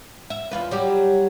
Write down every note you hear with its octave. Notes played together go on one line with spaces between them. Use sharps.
E5
E2 F4 B4
F#3 G3 G4